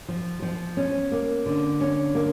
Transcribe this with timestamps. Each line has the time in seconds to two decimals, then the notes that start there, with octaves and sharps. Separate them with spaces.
0.08 F3
0.42 F3
0.77 C#4
1.12 A#3
1.46 D3
1.81 C#4
2.15 A#3